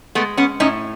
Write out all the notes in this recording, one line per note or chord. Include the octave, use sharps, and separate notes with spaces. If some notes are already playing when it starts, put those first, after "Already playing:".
G#3 A3 B3
B3 C#4
A2 C#4 D#4